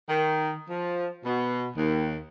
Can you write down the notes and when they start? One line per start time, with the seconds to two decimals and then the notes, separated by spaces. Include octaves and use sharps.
0.09 D#3
0.69 F3
1.25 B2
1.77 D#2